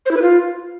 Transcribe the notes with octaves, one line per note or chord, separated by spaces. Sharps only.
C5
E4
B4
F4